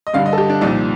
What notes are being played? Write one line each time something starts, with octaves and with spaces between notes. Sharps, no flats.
D#5
G2 D3 G3 F5
D#5
A4
G4
D4
C2 A#2 F3 D#4